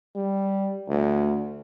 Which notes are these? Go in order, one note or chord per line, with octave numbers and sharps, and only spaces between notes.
G3
D2